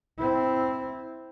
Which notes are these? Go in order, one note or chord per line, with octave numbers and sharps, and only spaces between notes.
C4 E4